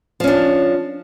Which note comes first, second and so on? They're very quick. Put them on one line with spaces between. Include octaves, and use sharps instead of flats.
F3 C#4 D4